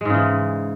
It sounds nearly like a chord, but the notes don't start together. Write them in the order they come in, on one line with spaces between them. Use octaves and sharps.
G#3 G#2 C#3 E3